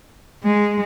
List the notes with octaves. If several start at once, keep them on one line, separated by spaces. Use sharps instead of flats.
G#3